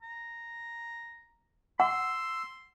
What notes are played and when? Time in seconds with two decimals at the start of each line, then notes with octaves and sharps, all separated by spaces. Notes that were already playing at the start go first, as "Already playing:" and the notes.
0.02 A#5
1.80 F#5 C6 E6